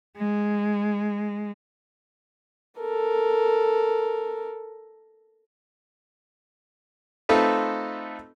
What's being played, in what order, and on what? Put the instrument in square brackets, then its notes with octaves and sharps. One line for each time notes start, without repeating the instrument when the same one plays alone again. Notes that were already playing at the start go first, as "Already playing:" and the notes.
[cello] G#3
[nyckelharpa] A4 A#4
[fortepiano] A3 C4 D#4 F4 A4 B4